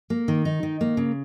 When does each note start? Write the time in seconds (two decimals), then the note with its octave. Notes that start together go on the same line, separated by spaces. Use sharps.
0.10 A#3
0.28 D#3
0.45 D#4
0.63 D#3
0.81 A#3
0.97 C#3